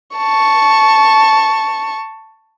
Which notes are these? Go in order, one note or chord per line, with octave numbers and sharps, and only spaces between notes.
A5 C#6